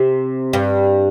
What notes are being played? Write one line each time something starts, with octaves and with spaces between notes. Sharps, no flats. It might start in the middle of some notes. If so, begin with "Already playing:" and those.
Already playing: C3
G2